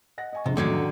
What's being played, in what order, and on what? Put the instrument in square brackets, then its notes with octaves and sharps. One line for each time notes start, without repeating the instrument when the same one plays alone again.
[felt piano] D#5 F#5 A#6
D#5 G#5 C#6
[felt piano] F2 G#3 D4 [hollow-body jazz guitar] C3
[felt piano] F1 F#2 A2 [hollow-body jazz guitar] D3 D#3 F#3
[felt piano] A1